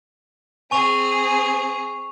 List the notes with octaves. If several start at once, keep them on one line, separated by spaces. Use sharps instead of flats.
C4 G#4 G#5 C#6 F7